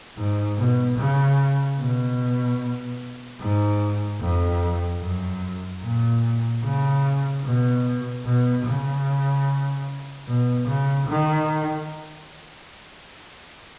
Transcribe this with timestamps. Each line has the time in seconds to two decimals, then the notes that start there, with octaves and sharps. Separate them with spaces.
0.17 G#2
0.58 B2
0.98 C#3
1.79 B2
3.41 G#2
4.21 F2
5.02 F#2
5.83 A#2
6.64 C#3
7.45 B2
8.26 B2
8.66 C#3
10.28 B2
10.68 C#3
11.08 D#3